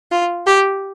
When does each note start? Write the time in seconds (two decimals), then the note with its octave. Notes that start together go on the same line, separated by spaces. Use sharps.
0.11 F4
0.46 G4